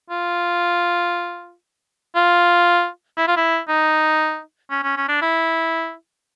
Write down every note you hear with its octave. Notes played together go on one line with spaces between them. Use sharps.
F4
F4
E4
F4
E4
D#4
C#4
C#4
C#4
D4
E4